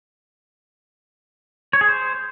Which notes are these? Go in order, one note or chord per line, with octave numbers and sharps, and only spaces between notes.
C#5
G#4
C5